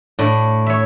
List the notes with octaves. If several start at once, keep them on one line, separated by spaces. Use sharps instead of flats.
A2 D4
C#5 E5